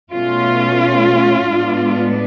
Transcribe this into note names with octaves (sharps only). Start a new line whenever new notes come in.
B2 A3 C#4 F4
A2 G#3 B3 D4